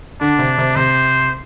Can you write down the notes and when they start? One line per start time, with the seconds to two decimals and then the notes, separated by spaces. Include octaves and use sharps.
0.21 D3 D4
0.39 C3
0.58 C3
0.76 C3 C5